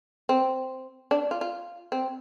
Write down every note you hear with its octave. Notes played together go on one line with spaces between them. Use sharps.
C4
D4
F4
F4
C4